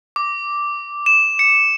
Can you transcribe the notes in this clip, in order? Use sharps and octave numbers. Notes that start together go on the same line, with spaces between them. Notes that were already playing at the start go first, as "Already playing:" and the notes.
D6
E7
C#7